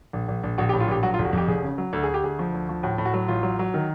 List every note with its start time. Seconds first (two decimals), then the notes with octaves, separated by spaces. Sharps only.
0.13 A#1
0.28 A#1
0.43 A#1
0.58 A#1 F#4
0.69 G4
0.73 A2
0.80 F4
0.88 A#1 G4
1.03 F#3 F#4
1.14 F4
1.19 F1
1.25 F#4
1.33 F2 G4
1.48 F1 G#4
1.63 C#3
1.78 F#3
1.93 D2 A4
2.03 D2 G#4
2.14 G4
2.24 D2 G#4
2.39 F3
2.54 D2
2.69 F3
2.83 A2 F#4
2.98 A2
3.05 F#4
3.14 F#3
3.28 A1 F4
3.43 F#3
3.59 F#3
3.74 D#3